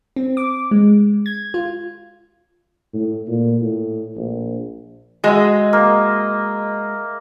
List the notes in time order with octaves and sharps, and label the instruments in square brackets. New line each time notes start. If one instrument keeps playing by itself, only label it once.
[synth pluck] C4
D6
G#3
G#6
F4
[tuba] A2
A#2
A2
A#1
[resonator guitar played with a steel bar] G#3 F#4 G#4 [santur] D#5 E5
[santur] A#3